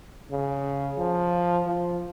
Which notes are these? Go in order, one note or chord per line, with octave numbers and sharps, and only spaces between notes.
C#3
F3
F3